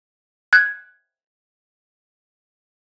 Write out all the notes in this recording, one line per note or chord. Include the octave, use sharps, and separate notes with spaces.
F#6 G#6